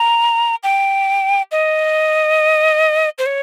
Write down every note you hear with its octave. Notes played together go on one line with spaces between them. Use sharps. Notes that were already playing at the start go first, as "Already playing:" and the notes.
Already playing: A#5
G5
D#5
C5
C#5